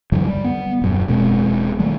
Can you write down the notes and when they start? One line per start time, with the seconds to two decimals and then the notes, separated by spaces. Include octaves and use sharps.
0.12 G2 D3 E3 F#3
0.28 G3
0.44 B3
0.82 D#1 F#2
1.08 E1 B2 G#3 C4
1.79 D#3 G3 A3